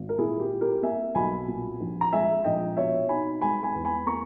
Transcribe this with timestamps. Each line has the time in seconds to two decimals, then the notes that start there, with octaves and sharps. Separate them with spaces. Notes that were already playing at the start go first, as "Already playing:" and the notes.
Already playing: G#1
0.09 A#4
0.18 A#2 E4 G#4
0.40 G4
0.51 E4
0.61 G4 A#4
0.82 A#3 E5 G#5
1.15 B1 G#5 B5
1.48 A#2
1.80 A#1
2.01 A#5
2.13 G#3 E5 G#5
2.44 A#1 D#5 G5
2.77 B2 C#5 E5
3.09 D#4 G#5 B5
3.41 G#3 G#5 B5
3.63 G#5 B5
3.74 E2
3.85 G#5 B5
4.06 A#3 A#5 C#6